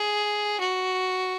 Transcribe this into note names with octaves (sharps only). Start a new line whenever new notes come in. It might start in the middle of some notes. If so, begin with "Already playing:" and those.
Already playing: G#4
F#4